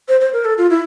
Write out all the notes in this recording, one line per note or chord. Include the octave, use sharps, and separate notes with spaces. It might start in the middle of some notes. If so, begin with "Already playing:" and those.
C5
C5
A#4
A4
F4
E4